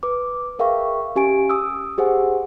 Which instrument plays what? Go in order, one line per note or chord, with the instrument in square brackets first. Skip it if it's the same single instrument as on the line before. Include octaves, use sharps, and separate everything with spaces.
[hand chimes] B4 D6
G#4 A#4 E5 F5 G5 C#6
C#4 G4 G#5 D7
D#6 E6
G4 G#4 C5 F#5 G#5